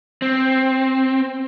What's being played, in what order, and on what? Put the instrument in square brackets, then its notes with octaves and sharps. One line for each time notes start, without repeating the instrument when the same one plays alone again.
[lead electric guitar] C4